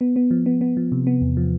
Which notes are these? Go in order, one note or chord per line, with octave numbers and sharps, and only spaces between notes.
B3
B3
F3
B3
B3
F3
C3
B3
E2
F3